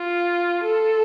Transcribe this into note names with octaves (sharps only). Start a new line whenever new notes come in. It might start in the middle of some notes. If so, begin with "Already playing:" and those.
Already playing: F4
A4